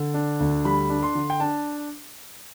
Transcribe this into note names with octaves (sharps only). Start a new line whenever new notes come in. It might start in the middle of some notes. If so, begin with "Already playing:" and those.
Already playing: D3
D4
D2
G3 B5
D4
C6
D3
G5
D4 A5